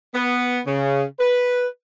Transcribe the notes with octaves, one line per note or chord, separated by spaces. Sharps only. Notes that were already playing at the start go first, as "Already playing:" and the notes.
B3
C#3
B4